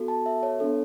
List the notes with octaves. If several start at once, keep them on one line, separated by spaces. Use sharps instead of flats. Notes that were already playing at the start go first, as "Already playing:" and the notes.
Already playing: B3 F#4 A4
A5
E5
C#5
B3 D4 A4